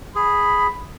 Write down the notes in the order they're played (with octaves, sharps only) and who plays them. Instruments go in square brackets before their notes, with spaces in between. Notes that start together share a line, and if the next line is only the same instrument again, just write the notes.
[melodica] G#4 [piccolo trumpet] B5